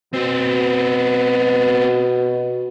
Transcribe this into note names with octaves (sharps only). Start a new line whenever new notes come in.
B2 B3 C4